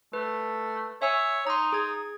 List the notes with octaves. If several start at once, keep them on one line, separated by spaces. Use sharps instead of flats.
A3 B4
C#5 E5 G#5 E6
D#4 A#5 C6
G#4 G#6